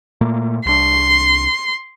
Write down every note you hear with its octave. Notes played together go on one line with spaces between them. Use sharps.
A#2 A3 A#3
C2 D4 C6